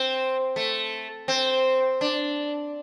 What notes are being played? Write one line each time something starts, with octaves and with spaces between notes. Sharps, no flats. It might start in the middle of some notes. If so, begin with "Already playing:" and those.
Already playing: C4
A3
C4
D4